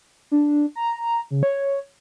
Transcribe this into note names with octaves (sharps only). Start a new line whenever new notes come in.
D4
A#5
C#3
C#5